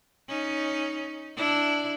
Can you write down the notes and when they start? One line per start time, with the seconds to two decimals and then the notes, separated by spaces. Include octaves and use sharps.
0.29 C#4 D#4
1.36 D4 E4